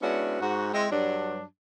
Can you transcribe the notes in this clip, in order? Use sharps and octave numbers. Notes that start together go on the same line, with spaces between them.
G#3 B3 C#4 D4 E4 F#4
G#2 F#4
G#3 C4 E4
G2 F#3 D4